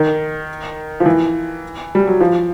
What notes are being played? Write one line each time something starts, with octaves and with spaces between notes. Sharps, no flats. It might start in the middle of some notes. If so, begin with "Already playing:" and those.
Already playing: D#3
F3
E3
G3
F#3
F3